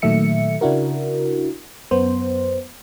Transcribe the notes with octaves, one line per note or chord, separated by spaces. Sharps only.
A#2 D#3 F#3 A3 E5 C#7
C#3 D4 E4 F#4 A#4
F#2 B3 C5